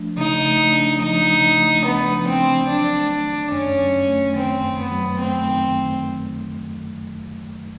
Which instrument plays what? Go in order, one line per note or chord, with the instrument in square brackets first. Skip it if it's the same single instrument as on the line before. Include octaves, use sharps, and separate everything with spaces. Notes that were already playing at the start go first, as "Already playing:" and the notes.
Already playing: [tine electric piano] F3 A3 D4
[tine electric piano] C#3 [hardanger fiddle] D#4
[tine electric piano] A3
D4
[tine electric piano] F3 [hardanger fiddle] D#4
[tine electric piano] C#3
A3
[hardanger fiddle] B3 [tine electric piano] D4
[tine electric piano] F3
[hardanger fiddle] C4
[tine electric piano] C#3
[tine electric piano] F#3 [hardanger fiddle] D4
[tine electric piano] A3
D#3
[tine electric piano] F#2 [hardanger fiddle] C#4
[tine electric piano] F#3
A3
[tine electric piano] D#3 [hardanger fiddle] C4
[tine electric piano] F#2
[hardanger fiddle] B3
[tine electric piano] F#3
[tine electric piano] A3 [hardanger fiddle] C4
[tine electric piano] D#3